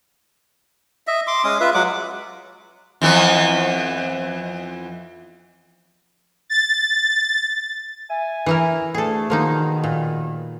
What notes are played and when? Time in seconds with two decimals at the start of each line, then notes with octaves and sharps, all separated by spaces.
1.07 D#5 E5
1.27 C6 D6
1.44 G#3 C#4 D#6
1.60 F4 B4 E5
1.74 F#3 G#3 F#5 D6
3.02 F2 E3 B3
6.49 A6
8.10 E5 G#5
8.46 E3 E4 A#4
8.94 D2 D3 A3 G#4 A4
9.30 B2 D#3 F3 A#3 D#4
9.84 A#2